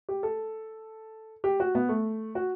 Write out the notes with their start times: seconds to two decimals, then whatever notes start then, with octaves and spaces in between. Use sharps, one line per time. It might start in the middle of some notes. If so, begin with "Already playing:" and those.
0.09 G4
0.23 A4
1.44 G4
1.60 F#4
1.75 B3
1.89 A3
2.35 F#4